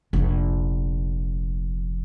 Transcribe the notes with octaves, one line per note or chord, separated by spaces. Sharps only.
F1 A#1